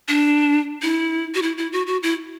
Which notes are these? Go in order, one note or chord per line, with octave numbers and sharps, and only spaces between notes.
D4
E4
F#4
E4
E4
F#4
F#4
E4